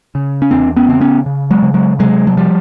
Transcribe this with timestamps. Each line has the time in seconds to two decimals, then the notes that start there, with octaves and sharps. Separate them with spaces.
0.15 C#3
0.42 C#4
0.51 E2 C4 D4
0.77 B3 C#4
0.88 C#3 C4
1.00 B3 C#4
1.26 C#3
1.51 F#3 G#3
1.63 C#3
1.74 F#3 G#3
1.99 C3 F#3 G#3
2.27 F#3
2.37 F3 G3